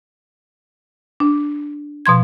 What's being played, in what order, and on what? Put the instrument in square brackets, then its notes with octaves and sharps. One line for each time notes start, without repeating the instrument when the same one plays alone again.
[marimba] D4
B2 F3 C6 G#6